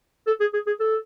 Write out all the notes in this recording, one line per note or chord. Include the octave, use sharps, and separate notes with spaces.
A4
G#4
G#4
G#4
A4